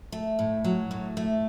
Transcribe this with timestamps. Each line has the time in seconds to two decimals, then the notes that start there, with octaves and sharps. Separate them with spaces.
0.12 A3
0.39 A2
0.64 F#3
0.91 A2
1.17 A3